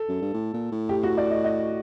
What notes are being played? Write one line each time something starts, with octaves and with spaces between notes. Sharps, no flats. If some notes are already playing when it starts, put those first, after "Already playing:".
Already playing: A4
F#2
G2
A2
A#2
A2
G4
F#4
D5
D#5
D#5